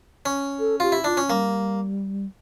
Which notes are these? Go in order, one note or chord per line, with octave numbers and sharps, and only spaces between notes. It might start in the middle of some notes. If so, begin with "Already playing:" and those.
C#4
A4
F4 G4
E4
D4 F4
C#4
G3 A#3